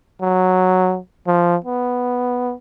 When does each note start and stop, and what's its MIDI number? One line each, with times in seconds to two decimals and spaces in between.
0.21 0.98 54
1.27 1.56 53
1.65 2.54 59